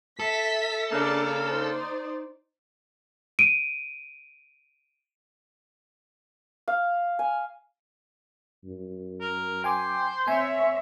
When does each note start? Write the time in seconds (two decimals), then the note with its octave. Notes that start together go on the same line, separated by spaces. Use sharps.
0.19 A4 E5 B6
0.91 C#3 A#3 D4 D5
1.49 D#4 C5 D5
3.39 D7 D#7
6.68 F5
7.19 G#5
8.65 F#2
9.21 A#4
9.64 C5 G5 G#5 D6
10.27 C4 C#5 E5 G#5